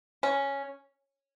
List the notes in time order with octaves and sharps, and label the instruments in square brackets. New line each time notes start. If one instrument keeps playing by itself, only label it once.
[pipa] C#4